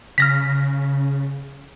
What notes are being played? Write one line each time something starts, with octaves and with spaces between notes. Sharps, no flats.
C#3 F6 A#6 B6